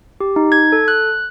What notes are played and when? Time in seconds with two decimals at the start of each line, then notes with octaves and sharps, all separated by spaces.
0.20 G4
0.36 D#4
0.52 G#6
0.72 A4
0.88 F#6